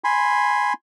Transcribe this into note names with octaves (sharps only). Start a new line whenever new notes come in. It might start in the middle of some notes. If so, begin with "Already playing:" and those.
G#5 B5 C6